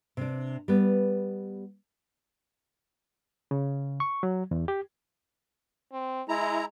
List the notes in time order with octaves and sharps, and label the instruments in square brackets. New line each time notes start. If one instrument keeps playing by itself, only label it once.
[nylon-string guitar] C3 D4
G3 B3
[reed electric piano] C#3
C#6
F#3
E2
G4
[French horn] C4
[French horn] G#3 [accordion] E4 A#5